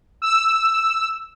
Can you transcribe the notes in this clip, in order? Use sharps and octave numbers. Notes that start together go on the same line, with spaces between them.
E6